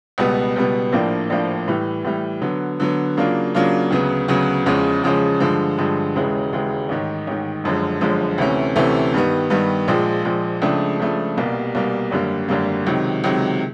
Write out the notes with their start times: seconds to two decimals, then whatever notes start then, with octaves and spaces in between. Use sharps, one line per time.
0.18 C#2 B2 G3 B3
0.56 C#2 B2 G3 B3
0.93 A#1 A2 F3 A#3 D4
1.30 A#1 A2 F3 A#3 D4
1.68 A2 E3 G3
2.05 A2 E3 G3
2.41 D3 F#3 B3
2.80 D3 F#3 B3
3.17 C#3 F#3 A#3 D4 F4
3.54 C#3 F#3 A#3 D4 F4
3.91 D2 C#3 F#3 B3
4.28 D2 C#3 F#3 B3
4.66 E2 C#3 F3 G#3 C#4
5.03 E2 C#3 F3 G#3 C#4
5.40 G2 D3 F3 G#3
5.78 G2 D3 F3 G#3
6.15 E1 D#2 C#3 E3 G#3
6.52 E1 D#2 C#3 E3 G#3
6.89 A1 G#2 D#3
7.27 A1 G#2 D#3
7.64 G1 F#2 D3 F3 G#3
8.01 G1 F#2 D3 F3 G#3
8.38 D2 C3 E3 A3 C#4
8.76 D2 C3 E3 A3 C#4
9.14 G2 D#3 G3 B3
9.50 G2 D#3 G3 B3
9.88 A#1 A#2 F3 G#3
10.25 A#1 A#2 F3 G#3
10.62 C#2 C#3 F3 A3 D4
10.99 C#2 C#3 F3 A3 D4
11.37 C2 B2 G3 A#3
11.75 C2 B2 G3 A#3
12.11 G#1 F#2 D3 G3 A#3
12.48 G#1 F#2 D3 G3 A#3
12.86 C#2 C3 D#3 F#3
13.24 C#2 C3 D#3 F#3